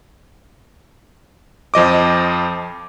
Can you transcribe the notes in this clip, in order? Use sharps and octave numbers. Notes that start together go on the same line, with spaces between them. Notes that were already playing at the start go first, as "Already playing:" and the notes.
F2 F3 D#5 D6